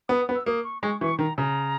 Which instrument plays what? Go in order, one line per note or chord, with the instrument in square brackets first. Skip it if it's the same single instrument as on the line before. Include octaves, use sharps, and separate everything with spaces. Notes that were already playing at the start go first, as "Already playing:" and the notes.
[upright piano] B3 [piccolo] D#6
[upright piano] B3
[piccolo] E6
[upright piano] A#3 [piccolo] D#6
[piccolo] C#6
[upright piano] G#3 [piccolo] C#6
[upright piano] E3 [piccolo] C#6
[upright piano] D#3 [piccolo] A#5
[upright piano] C#3 [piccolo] A#5